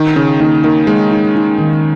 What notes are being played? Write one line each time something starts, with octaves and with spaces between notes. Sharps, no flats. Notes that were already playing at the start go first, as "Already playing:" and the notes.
Already playing: D#3 D#4
C#3 D#4
D#3 A#3
D#3 A#3
G#3 A#3
D#4
D#4
D#3